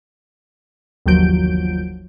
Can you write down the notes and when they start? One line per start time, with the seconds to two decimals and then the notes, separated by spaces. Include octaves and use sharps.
1.06 G1 D#2 F3 F#3 G6 D7